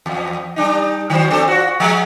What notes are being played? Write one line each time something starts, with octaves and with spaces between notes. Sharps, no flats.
E2
G3 D4 D#4
D#3 F#3 C5
C4 D4 A4
F4 F#4
F3 G#3